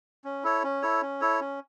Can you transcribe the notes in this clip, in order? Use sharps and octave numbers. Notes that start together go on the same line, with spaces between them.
C#4
E4 A4 C#5
C#4
E4 A4 C#5
C#4
E4 A4 C#5
C#4